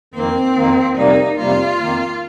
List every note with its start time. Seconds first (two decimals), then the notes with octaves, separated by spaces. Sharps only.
0.14 F2 D#3 A#3 C4
0.56 F2 D#3 A#3
0.97 F2 C3 G3 A#3 D#4
1.38 F2 C3 G3 A#3 F4
1.80 F2 D#3 A#3